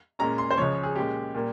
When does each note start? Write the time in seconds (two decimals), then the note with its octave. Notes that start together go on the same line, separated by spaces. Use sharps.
0.19 A#2 G#3 C#4 A#5
0.38 C6
0.51 C5
0.58 C#2 C#3 F3 C#5
0.83 G#4
0.96 A#2 G#3 C#4 G4
1.35 A#2 G3 A#3